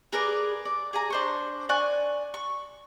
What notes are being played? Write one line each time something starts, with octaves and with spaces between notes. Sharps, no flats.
G#4 A#4 B4 D5
D5
G#4 G#5 A#5
D4 C5 C#6
D5 G#5 C#6 F#6
C#6